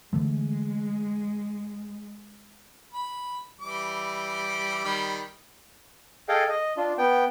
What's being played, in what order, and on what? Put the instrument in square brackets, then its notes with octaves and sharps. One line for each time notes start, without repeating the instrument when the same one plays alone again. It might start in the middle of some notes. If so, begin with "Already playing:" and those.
[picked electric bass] D3 E3 A3 [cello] G#3
[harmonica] B5
E3 G3 D6
D#3 G3 B5
[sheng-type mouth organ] G#4 A4 D#5 F5 G5
D#5
D4 F4
B3 G5